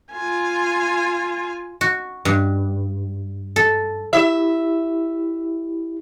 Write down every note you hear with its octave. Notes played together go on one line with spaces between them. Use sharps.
F4 G#5
F#4
G2
A4
E4 G4 E5